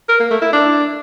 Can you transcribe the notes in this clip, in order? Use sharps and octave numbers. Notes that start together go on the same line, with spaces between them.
A#4
A#3
A3
E4
D4